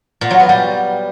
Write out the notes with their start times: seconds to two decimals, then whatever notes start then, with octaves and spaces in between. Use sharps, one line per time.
0.21 A#2
0.31 F#3
0.40 B3
0.49 G3